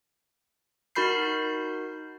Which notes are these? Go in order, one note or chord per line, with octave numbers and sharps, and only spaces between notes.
D#4 F#4 A#4 B5 G6 C7